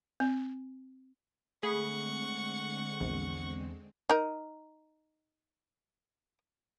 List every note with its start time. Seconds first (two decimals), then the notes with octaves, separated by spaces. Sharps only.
0.20 C4
1.63 D3 G#3 A3 C4 G#4 F#5 B5 C#6
3.00 A#1 E2
4.09 D#4 A#4